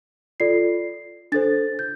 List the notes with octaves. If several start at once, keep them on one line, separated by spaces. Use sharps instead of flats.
F4 A4 D5 C7
D4 A4 C5 A6
G6